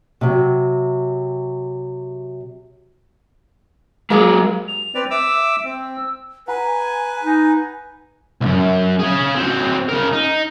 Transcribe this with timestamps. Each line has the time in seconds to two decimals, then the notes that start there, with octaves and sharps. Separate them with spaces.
0.21 C3 F#3
4.10 F#3 G#3 A#3 G#4
4.68 F7
4.95 C4 B4 D5
5.11 E5 D6 E6
5.64 C4 E6
6.48 B4 F#5 G#5 A#5
7.23 D#4
8.41 C2 F#2
9.00 C#4 G#4
9.36 F#3 C4
9.89 C#3 A#4
10.12 D#4